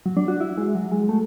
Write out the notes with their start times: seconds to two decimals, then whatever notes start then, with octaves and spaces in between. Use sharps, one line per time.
0.06 F#3
0.17 D4
0.28 F#4
0.40 E4
0.58 G#3
0.75 F#3
0.92 G#3
1.09 A3